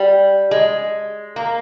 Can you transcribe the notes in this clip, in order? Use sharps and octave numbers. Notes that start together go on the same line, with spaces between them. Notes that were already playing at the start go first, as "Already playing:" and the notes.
Already playing: G3
G#3
A#3